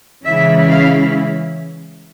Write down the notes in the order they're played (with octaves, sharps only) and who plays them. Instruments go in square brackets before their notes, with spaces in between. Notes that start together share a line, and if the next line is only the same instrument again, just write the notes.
[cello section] C#3 E3 G#3 C#4 E4 E5
F5